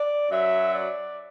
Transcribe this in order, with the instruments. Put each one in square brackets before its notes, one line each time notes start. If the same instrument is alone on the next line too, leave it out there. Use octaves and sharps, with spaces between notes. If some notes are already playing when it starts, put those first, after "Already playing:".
Already playing: [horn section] D5
F#2 F#3 E5
D5